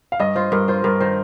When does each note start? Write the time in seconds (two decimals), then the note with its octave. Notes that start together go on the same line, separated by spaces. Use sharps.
0.12 F5
0.19 G2 D#5
0.35 F4 C5
0.52 G2 A#4
0.68 F4 C5
0.84 G2 A#4
1.00 D#3 C5